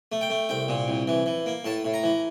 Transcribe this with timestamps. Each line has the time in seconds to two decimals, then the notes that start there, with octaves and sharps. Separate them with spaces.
0.12 A3
0.21 G5
0.30 A3
0.49 C2 G5
0.68 A#2
0.88 C2
1.08 E3
1.26 E3
1.46 A#3
1.65 A2 A5
1.85 A2
1.94 A#5
2.03 E3